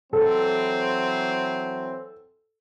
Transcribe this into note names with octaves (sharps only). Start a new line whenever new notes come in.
E3 F#3 C4 A4